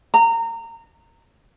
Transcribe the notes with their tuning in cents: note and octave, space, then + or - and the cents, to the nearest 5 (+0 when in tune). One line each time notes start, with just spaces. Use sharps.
A#5 -25